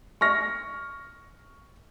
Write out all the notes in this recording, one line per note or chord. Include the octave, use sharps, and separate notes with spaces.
C#6 F6 A#6